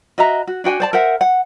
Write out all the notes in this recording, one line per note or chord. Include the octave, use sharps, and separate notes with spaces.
F#4 D#5 E5 A#5
F#4
D4 F#4 G5 G#5
C5 D5 A5
A#4 C5 E5 F#5
F#5